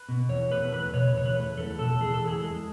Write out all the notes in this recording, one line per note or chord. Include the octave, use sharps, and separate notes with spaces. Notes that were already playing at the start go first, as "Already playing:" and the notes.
Already playing: B4
B2
E2 C#5
A3 B4
E2 B4
B2 C#5
E2 C#5
B4
A3
E2 A4
B2 A4
E2 G#4
A4
E3
G#4
G#3